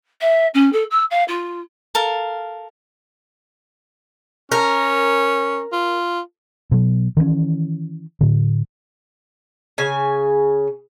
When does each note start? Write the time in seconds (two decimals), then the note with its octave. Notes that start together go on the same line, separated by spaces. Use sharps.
0.21 E5
0.54 C#4
0.72 A4
0.90 E6
1.10 F5
1.28 F4
1.95 A4 A#4 F5
4.52 C#4 A#4
5.72 F4
6.71 B2 F#3
7.17 D#3 E3 A#3 C#4
8.21 A2 D3
9.78 C#3 G#5